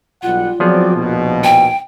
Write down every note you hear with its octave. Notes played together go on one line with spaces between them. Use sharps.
B1 G3 F4 F#5
F3 F#3 B3 C4 G#4 D5
A#1 D#2 B2
G5 G#5